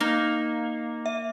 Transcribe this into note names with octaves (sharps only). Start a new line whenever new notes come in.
A#3 D#4 F5
E5